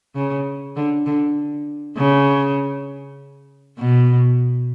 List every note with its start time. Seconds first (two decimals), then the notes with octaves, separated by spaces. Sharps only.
0.15 C#3
0.76 D3
1.06 D3
1.97 C#3
3.79 B2